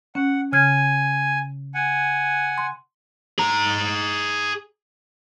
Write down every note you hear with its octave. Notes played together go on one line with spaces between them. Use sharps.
C#4 F#5
C#3 G#5 F6 G#6
F#5 G#5
C6
G#4 A#5